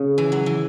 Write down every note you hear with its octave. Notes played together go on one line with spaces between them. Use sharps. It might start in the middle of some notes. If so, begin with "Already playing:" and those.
Already playing: C#3
E3
F#3
E3